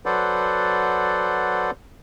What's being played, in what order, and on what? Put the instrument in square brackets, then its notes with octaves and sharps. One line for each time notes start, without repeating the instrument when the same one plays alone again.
[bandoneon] F#3 A4 B4 C5 D5 F#5